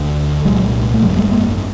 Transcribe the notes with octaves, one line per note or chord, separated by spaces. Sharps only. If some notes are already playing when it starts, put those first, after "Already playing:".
Already playing: D2 D3
C2 A#2 F#3 G#3
A3
G#1 F#2 D3 F#3 G#3
G3 A3
G#3 A#3